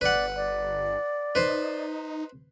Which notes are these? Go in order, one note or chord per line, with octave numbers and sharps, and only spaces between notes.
G1 B4 D5 F#5
D5
D#4 B4 C5